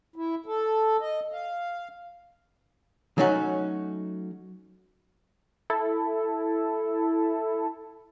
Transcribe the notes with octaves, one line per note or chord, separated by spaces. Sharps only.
E4
A4
D#5
F5
F#3 A3 C#4 D#4 F#4
E4 A4